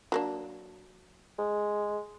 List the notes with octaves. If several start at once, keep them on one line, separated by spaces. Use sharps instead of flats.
F#3 A#3 D4
G#3